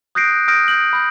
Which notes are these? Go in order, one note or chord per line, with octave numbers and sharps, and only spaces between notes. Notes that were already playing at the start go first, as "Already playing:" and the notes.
D#6 F#6 G6 A#6 C7 D7
D#6 F6 G6 A#6 D7
G6 F#7
B5 G6